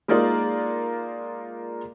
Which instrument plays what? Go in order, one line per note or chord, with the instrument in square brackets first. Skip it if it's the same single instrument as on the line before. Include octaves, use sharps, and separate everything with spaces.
[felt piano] G#3 A#3 D#4 F4 A#4 D5